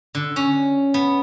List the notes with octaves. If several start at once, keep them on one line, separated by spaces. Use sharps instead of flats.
D3
C#4
B3